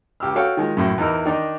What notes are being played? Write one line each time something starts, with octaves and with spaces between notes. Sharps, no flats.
C#2 G4 E6 F6
F#4 A4 C#5 F5 G5
D#3 G#3 F4
F#2 A2 C6
E2 E3 D#4 A#4 E6
D#3 D4 D#4